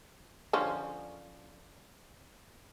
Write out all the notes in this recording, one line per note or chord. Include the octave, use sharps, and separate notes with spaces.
D3 F3 C#4